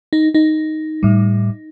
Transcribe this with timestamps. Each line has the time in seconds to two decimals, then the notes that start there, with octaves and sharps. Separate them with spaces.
0.13 D#4
0.34 D#4
1.03 A2 G3